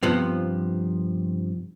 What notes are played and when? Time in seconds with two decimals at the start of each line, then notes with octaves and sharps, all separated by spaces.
0.03 G2 C3 F3 B3